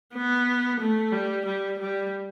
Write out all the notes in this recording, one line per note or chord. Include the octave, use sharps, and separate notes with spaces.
B3
A3
G3
G3
G3